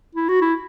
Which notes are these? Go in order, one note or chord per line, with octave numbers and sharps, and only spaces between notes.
E4
F#4
E4